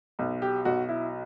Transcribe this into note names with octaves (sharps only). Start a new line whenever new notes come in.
B1
G4
B1 F#4
E4